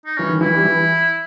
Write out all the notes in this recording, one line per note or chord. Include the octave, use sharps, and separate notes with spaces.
D#4
E3 C#4
D#3
E3 E4
G3
E3